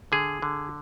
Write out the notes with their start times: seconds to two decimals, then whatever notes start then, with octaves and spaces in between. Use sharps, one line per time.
0.12 D3 G#4
0.42 D3